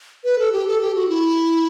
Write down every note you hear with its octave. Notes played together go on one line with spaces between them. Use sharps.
B4
A4
G4
A4
G4
F#4
E4